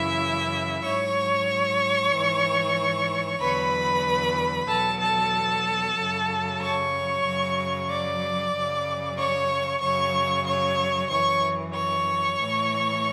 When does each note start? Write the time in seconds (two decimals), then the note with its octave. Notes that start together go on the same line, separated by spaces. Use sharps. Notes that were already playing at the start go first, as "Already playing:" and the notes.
Already playing: F#2 C#3 E3 E4 E5
0.83 G#2 F#3 C#5 C#6
2.12 G#2 E3
3.40 E2 D3 F#3 B4 B5
4.68 E2 B2 F#3 A4 A5
5.00 A4 A5
5.97 F#2 C#3 F#3
6.61 C#5 C#6
7.25 F#2 C#3 F#3
7.89 D5 D6
8.54 F#2 C#3 F#3
9.18 C#5 C#6
9.82 F#2 C#3 F#3 C#5 C#6
10.46 C#5 C#6
11.10 F#2 E3 C#5 C#6
11.74 C#5 C#6
12.38 A2 E3